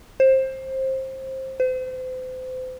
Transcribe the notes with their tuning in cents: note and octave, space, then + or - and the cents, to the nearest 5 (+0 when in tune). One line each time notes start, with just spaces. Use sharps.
C5 +20
C5 -35